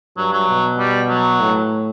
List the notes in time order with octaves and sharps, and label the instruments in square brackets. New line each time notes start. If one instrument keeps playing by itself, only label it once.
[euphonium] G2 [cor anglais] F#3
[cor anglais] F#3
[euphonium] B2
[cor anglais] G3
F#3
[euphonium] A2